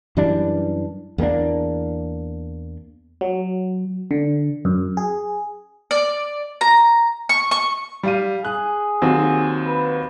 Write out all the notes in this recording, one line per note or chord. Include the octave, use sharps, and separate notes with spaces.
F#2 E3 G3 D4
E2 A#3 B3 D4
F#3
D3
F#2
G#4
D5
A#5
C#6
C#6
G3 F5 D#7
G#4 F#6
D#2 F#3 C4
B4